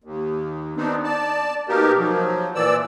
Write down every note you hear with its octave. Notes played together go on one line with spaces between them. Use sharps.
D#2
B3 C4 D4 D#4
D5 A5
B2 A#3 D#4 G4 A#4
F3 F#3
A#2 E3 D5 E6